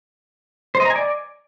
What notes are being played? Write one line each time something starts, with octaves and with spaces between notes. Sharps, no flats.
C5
D#5
A#5
G#5
D5